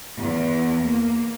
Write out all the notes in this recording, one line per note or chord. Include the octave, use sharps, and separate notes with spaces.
E2
A#3